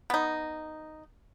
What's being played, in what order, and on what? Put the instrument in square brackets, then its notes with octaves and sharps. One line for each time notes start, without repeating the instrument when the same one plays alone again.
[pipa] B3 D#4